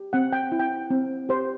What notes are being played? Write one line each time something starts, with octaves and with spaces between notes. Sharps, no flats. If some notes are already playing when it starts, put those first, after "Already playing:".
Already playing: G4
C4 F#5
G5
E4
G5
C4
G4 C5